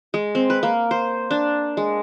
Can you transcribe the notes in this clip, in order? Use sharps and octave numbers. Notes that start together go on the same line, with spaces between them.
G#3
C4
B4
A#3
C5
D4
G#3